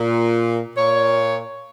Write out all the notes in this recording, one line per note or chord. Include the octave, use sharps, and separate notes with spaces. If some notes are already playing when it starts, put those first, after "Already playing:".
Already playing: A#2
A#2 C#5